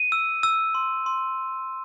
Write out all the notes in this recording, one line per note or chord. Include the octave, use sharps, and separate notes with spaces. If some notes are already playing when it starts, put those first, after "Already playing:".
Already playing: D#7
E6
E6
C6
C6